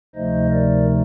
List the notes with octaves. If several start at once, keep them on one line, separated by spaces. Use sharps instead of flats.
D2 C3 F3 A3 D#4 C5 D#5
A#4 D5